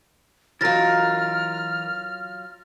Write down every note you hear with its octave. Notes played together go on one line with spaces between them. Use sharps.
E3 F#3 F4 A#4 F6 A6 A#6